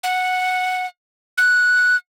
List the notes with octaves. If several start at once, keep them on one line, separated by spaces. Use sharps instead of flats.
F#5
F#6